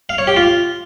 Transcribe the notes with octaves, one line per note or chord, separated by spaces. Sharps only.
F5
C#5
G4
F4